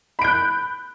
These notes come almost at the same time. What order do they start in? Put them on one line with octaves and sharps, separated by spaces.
B5 D7 G6 F#6